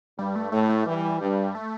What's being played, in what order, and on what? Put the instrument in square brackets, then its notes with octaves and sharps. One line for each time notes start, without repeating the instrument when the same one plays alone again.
[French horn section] G2 [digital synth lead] G3
[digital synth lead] A3
[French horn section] A2 [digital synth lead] A3
[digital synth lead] A3
[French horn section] E3 [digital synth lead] G3
[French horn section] G2
[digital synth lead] A3